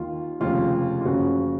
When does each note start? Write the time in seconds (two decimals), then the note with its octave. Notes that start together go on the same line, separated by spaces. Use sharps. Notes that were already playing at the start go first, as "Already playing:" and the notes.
Already playing: D#2 D#3 F4
0.40 F1 D#2 C#3 F3 F4
1.01 F4
1.05 F#1 F#2 C#3 F3 F#4